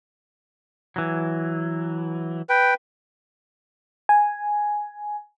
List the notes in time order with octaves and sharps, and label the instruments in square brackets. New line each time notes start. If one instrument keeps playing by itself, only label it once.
[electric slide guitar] E3 F#3
[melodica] B4 G5
[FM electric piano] G#5